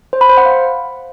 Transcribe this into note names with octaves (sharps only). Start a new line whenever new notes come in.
C5
B5
C5
F#5
F5